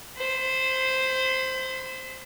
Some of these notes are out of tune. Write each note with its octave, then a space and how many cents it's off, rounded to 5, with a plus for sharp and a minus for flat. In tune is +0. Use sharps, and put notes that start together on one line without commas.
C5 +0 B5 +35